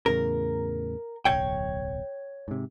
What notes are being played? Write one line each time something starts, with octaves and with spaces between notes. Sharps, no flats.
E2 A2 C#3 A#4
D1 B1 C#5 G5
G#2 C3